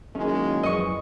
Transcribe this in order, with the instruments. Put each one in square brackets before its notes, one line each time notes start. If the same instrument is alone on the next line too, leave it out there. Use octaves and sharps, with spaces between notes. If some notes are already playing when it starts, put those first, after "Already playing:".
[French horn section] D#3 F#3 A#3 [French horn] G#3 [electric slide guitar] C#4 E4
[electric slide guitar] F#2 F3 B4 [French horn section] E3 [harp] D#5 C#6